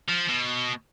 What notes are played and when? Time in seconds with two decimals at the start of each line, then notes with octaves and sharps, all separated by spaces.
0.09 F3
0.29 B2